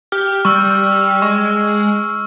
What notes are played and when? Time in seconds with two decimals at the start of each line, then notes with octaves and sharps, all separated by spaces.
0.12 G4 F6
0.45 G3 C#6 E6
1.22 G#3 C#6